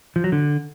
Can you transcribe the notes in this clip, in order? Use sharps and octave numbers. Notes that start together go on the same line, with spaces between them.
F3
F#3
D3